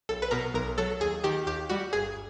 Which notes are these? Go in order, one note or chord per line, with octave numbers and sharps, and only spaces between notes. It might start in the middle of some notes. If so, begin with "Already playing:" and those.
B1 A4
B4
B2 A#4
B1 A#4
F#3 A4
D#2 G#4
D#3 G4
D#2 G4
G3 F#4
G1 G#4